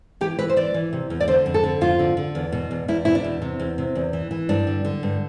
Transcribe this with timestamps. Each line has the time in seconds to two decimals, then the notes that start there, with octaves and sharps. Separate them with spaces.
0.21 E3 G4
0.39 E3 B4
0.50 C5
0.56 E3 D5
0.74 E3
0.93 C3
1.10 E2
1.20 D5
1.28 D3 C5
1.46 F2
1.54 A4
1.64 D3
1.81 F2 F4
1.99 D3
2.17 D3
2.35 E2
2.52 B2
2.71 E2
2.88 E2 E4
3.05 B2 E4
3.15 D4
3.24 E2
3.42 C3
3.59 E2
3.78 C3
3.95 E2
4.13 E3
4.31 E3
4.49 G2 D4
4.67 D3
4.85 D3
5.03 G2